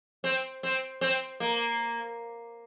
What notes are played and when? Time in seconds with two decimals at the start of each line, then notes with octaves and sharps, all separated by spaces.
0.24 C4
0.63 C4
1.01 C4
1.40 A#3